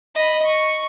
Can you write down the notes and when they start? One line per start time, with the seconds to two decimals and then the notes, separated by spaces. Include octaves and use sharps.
0.15 D#5 B5
0.45 C#6